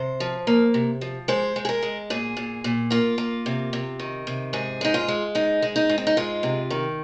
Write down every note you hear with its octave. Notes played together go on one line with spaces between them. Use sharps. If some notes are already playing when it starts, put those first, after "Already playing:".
Already playing: C3 C5
F3
A#3
C3
F3
G#3 C5
G#3
G#4
A#4
G#3
A#2 G#4
A#2
A#2
A#3 F4
A#3
C3
C3
D#3
C3
G#2 G#4
G#3 D#4
F4
G#3
G#2 D#4
G#3
D#4
G#2
C4
D#4
G#3 F4
C3
D#3